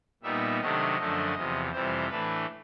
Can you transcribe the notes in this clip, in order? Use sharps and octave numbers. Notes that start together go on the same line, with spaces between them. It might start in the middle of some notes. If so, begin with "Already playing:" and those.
A#2 G3 B3 D#4 E5
C3 D#3 F#3 A3 D4 D#5
F#2 D3 F3 A3 D4
E2 C3 F3
F2 C3 E3 G3 C5
A2 E3 A3 D4 B4